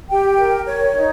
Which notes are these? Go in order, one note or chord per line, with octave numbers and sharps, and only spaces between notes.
G4 G5
A#4
C#5
D#4